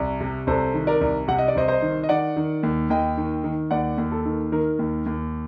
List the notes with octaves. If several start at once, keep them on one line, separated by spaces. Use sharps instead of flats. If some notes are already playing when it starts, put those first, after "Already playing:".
Already playing: C2
C3
C2 A4 C5
D#3
A#4 D5
C2
C3 F#5
D#5
D5
C2 C5 D#5
C5 D#5
D#3
D#5
D#3 D5 F#5
D#3
D#2
D#2 D#5 G5
D#3
D#3
D#2 D5 F#5
D#2
A4
D#3
D#3 A#4
D#2
D#2